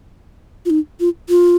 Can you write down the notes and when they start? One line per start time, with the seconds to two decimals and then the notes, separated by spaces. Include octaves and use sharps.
0.65 F4
0.70 D#4
1.00 F4
1.29 F4